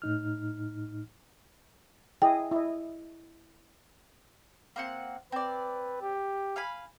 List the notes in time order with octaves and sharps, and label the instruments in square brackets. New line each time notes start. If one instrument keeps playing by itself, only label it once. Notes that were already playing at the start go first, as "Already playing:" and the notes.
[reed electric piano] A2 D#4 F6
[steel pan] E4 G#4 D#5 [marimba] G5
[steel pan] E4 D#5
[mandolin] A#3 C4 F#5
[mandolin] C4 D5 [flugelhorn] B4
[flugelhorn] G4
[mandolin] F5 G#5 B5